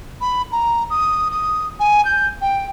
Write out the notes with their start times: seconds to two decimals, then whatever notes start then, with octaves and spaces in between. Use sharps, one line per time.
0.21 B5
0.52 A#5
0.90 D#6
1.31 D#6
1.80 G#5
2.05 G6
2.41 G5